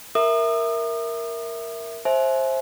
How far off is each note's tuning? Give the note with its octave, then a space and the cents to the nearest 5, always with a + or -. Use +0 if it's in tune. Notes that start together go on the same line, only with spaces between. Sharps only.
A#4 +0 E5 +0 D#6 -40
C5 +20 E5 +0 G#5 +40